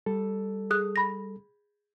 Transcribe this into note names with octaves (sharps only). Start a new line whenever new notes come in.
G3 A4
G#4 D#6 F#6
B5 A#6